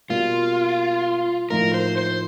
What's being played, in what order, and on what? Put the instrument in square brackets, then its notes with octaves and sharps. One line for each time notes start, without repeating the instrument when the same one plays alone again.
[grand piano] B2 G3 A#3 [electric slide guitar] F4
[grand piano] A2 F3 A#3 D#4 [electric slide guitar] A#4
[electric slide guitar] C5
C5